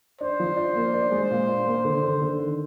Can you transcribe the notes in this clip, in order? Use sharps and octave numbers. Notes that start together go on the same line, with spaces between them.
D4 C5
F3
D4
A#3
D4
G#3
A#2
D4
A#3
D3
D3
D3
D#3